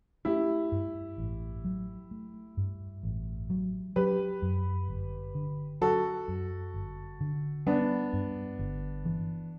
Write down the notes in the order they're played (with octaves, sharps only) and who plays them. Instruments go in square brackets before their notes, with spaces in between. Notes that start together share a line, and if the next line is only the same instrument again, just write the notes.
[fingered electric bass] A3 [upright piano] E4 G4
[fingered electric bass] G2
A1
F#3
A3
G2
A1
F#3
[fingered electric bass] F#3 [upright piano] G4 B4
[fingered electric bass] F#2
G1
D3
[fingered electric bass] F#3 [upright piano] F#4 A4
[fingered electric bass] F#2
G1
D3
[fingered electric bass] G3 [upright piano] B3 D4
[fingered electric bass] G2
G1
E3